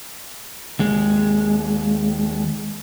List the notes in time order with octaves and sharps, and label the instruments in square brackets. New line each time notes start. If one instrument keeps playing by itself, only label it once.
[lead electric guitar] D#2 G#3